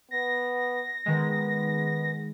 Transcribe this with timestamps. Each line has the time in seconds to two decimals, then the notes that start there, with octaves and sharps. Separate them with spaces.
0.11 B3 A#6
1.06 D#3 G#3 B3